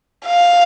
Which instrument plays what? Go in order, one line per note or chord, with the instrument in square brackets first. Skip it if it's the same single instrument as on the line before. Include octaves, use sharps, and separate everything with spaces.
[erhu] F5